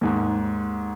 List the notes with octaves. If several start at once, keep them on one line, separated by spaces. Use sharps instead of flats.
D#2 G#2